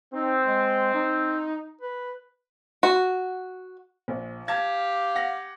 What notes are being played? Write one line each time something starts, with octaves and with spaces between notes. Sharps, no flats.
C4 D#4
G#3
D#4
B4
F#4
A#1
G4 F5 A5 G#6
F#5 A#6